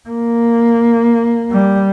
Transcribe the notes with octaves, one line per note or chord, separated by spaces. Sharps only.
A#3
G3